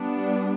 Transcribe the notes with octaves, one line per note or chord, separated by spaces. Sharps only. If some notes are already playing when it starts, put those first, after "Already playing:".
Already playing: G3 B3 D4